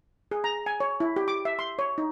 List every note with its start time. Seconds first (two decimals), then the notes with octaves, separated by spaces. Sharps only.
0.31 G#4
0.44 A#5
0.66 G#5
0.80 C#5
1.00 E4
1.16 G4
1.28 D6
1.45 E5
1.59 C6
1.79 C#5
1.98 D#4